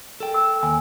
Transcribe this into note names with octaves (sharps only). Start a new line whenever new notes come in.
A4 G5
E6
D#2 G#5